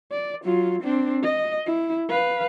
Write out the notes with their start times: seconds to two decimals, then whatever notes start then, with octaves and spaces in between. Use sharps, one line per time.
0.11 D5
0.44 F#3 F4
0.82 C4 D4
1.23 D#5
1.66 E4
2.09 B4 F5